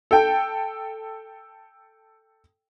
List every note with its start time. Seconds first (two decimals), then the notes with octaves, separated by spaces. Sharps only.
0.11 A4 G5